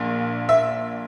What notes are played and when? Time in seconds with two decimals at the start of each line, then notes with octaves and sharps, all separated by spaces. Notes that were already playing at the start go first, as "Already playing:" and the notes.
Already playing: A#1 A#2
0.49 E5